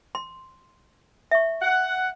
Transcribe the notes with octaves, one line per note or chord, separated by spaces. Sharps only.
C6
E5 C#6
F#5